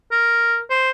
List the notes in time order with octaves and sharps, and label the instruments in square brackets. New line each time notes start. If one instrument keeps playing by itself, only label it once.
[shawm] A#4
C5